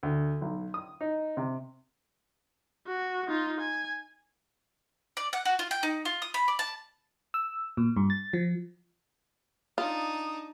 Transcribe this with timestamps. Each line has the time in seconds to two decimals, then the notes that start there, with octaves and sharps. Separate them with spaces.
0.03 D2
0.41 B1
0.74 D#6
1.01 D#4
1.37 C3
2.87 F#4
3.28 D#4 F4
3.60 G#5
5.17 D5
5.33 F#5
5.45 F#4
5.59 F4
5.71 G5
5.83 D#4
6.05 F4
6.22 D#6
6.34 B5
6.48 D5
6.59 A5
7.34 E6
7.77 A#2
7.96 G2
8.10 A6
8.33 F3
9.78 D4 D#4 F4 D#6